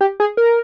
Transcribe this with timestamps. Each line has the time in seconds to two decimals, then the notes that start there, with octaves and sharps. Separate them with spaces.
0.01 G4
0.20 G#4
0.37 A#4